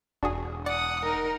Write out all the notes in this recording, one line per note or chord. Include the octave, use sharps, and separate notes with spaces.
E1 D4 F#4 G#4
D5 F#5 D#6 C#7
D#4 A#4